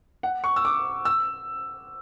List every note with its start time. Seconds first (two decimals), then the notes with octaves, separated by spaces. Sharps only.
0.23 F#5
0.44 C#6
0.56 E6
0.65 D6
1.05 E6